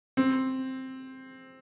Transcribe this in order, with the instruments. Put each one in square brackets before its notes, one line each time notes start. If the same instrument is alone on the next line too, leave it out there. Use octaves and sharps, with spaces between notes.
[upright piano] C4